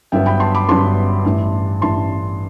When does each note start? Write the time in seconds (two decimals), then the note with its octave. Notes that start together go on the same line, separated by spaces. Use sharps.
0.12 G1 G2 F#3 B3 E5 G5
0.26 G5 B5
0.40 A5 C6
0.55 B5 D6
0.68 G1 G2 F#3 B3 A5 C6
1.25 A1 G2 E3
1.81 A1 G2 E3 A5 C6